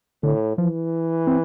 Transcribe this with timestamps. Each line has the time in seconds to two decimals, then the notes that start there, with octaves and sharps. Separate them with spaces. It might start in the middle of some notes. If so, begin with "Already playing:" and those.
0.23 A2 D3
0.58 E3 F3
1.27 C4